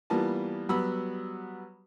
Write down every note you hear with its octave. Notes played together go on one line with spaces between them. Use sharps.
E3 G3 A#3 B3 F4 A5
F#3 G3 B3 B5 E6